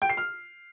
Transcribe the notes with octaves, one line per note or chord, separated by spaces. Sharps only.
G5
C7
F6